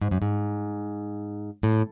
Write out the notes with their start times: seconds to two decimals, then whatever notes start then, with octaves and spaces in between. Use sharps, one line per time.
0.01 G#2
0.11 F#2
0.22 G#2
1.63 A2